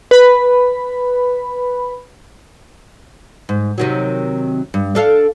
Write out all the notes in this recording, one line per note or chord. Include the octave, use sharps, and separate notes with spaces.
B4 B5
G#2
C3 D#3 F#3
G2
D4 A4 F5